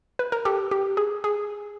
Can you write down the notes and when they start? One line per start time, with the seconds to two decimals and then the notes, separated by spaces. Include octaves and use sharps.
0.19 B4
0.32 A#4
0.45 G4 A4
0.71 G4
0.97 G#4
1.24 G#4